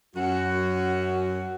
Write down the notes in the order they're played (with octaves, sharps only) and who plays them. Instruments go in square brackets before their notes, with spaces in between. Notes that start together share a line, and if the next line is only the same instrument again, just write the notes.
[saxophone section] F#2 F#4